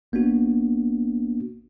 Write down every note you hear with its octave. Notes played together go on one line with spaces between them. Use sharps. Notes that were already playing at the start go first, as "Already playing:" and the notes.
G#1 A#3 B3 D4 F#4